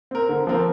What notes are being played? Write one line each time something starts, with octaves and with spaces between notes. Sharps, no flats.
C4 A#4
D3
F3 C4 A#4